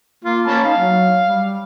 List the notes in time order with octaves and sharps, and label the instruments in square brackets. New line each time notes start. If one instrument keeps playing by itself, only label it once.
[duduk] A#3 [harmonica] F4
[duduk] A#3 [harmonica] C#4 A5 B5
[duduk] D#4 [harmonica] F5
[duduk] F#3
G3